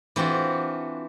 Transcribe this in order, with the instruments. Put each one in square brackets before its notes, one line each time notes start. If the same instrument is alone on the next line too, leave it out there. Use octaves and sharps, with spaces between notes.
[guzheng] E3 C4 D4 F4 F#4